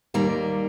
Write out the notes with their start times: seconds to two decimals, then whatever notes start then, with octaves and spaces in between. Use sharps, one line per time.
0.14 D#2 D#3 G3 A#3 A#5